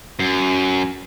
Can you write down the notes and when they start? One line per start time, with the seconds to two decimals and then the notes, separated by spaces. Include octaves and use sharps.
0.19 F#2